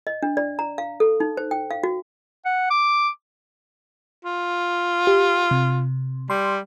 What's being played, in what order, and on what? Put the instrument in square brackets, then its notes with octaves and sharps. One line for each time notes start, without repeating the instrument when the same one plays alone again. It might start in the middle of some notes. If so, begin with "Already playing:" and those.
[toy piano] D#5
D4
D5
A#5
F5
A4
D#4
C5
G5
F5
F#4
[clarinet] F#5
D6
[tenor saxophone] F4
[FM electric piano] G4
C3
[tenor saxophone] G3 [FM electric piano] C6